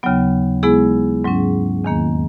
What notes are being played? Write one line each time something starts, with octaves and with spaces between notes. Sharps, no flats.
D#2 C#3 F#3 B3
G#3 B3 E4 G#4
G#2 F#3 C#4
E2 D#3 A#3